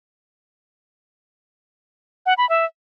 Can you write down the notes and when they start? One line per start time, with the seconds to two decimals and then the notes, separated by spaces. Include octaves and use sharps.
2.26 F#5
2.38 B5
2.49 E5